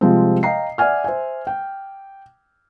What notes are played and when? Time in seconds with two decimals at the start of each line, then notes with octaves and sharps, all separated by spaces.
0.01 C3 F3 G3 G#3 C4
0.43 D#5 F5 G5 A#5 C7
0.78 D5 E5 F#5 G#5 F6
1.04 C5 E5 G#5
1.47 G5